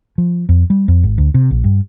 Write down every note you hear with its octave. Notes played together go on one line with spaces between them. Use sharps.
F3
F2
G3
F2
G#1
D2
C3
A#1
G2